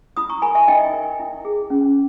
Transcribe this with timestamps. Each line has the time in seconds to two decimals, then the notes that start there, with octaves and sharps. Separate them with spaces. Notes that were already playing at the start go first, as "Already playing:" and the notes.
0.17 E4 B5 D#6
0.30 A#5 C#6
0.42 A#4 G#5 B5
0.55 E5 G#5
0.68 D#4 D#5 G5
0.94 A#4
1.20 E4
1.45 G#4
1.70 C#4